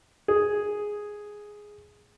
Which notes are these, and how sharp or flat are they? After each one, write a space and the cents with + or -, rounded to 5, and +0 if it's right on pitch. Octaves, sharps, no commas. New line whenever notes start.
G#4 +0